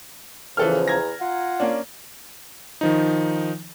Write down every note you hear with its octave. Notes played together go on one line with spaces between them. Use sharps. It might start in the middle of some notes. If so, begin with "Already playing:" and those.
E2 C#3 E3 F3 A4 F6
A#5 G#6 A#6
F4 F#5
A#3 C#4 D4
D#3 F3 D#4